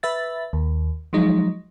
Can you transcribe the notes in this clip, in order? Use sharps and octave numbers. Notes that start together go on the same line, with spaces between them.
B4 E5 A6
D#2
F3 F#3 G#3 D#4